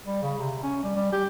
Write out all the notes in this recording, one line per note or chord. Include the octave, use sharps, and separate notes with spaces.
G3
C#3
C3
C#4
G3
G3
G4